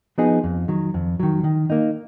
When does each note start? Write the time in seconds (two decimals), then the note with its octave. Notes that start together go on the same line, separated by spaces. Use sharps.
0.18 F3 B3 D#4 G#4
0.44 F2
0.68 D#3 F#3
0.94 F2
1.20 D#3 F#3
1.44 D#3
1.70 A#3 D#4